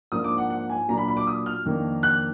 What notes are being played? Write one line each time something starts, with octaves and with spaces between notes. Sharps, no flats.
G#2 F3 A#3 D4 D#6
D6
F#5
F#5
G#5
A#2 F#3 A#3 D4 A#5
B5
B5
D6
D#6
F6
F2 D#3 A#3 D4
F#6